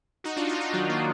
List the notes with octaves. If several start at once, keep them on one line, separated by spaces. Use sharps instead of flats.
D#4 F#4
D4 F4
D4 F4
D4 F4
D#3 F#3
F#3 A#3